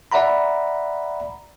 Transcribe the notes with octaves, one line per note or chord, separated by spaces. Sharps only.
D5 E5 F#5 A#5 B5